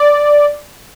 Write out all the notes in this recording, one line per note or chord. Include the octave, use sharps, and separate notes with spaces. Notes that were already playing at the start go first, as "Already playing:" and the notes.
Already playing: D5